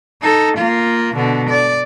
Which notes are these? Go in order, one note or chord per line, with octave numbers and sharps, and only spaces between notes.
D#4 A4
A#3 F4
B2 D3
D5